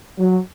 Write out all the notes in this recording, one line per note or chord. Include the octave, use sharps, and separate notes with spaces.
F#3